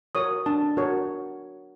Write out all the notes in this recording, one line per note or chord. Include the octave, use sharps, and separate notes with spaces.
F#4 A#4 C#5 D#6
D4 A5
F#4 A#4 C#5